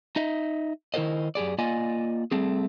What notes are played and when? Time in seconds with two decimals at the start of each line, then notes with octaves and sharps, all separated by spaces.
0.16 D#4 D#5 E5
0.94 D#3 E4 F4 A#4 C5 D#5
1.35 F#2 G4 G#4 D5
1.58 A#3 F4 D5 D#5 G#5
2.31 G3 A3 C4 G#4